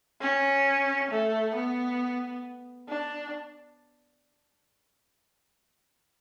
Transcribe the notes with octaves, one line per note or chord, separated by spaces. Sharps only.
C#4
A3
B3
D4